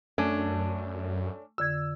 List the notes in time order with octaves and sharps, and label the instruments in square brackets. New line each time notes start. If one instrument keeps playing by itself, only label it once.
[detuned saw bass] F#2 [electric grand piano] A3 [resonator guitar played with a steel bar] C#4 D4
[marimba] F2 D3 G#6 [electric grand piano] E6